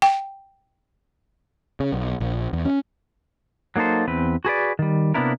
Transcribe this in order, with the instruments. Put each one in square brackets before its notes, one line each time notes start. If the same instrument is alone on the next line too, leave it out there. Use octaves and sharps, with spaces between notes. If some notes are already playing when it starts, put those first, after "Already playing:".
[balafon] G5
[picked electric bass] C#3
B1
A#1
E2
C#4
[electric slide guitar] F#3 A#3 D#4 A4 C5
E2 C4 B4
F#4 G#4 B4 D5
D#3 G3
C3 A#3 B3 D4 E4 A#4